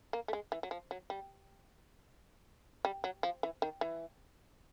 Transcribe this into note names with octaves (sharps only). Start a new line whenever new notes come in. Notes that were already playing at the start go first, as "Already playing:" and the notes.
A#3
A3
G#3
E3
F#3
F3
F#3
G3
G3
F#3
F3
E3
D#3
E3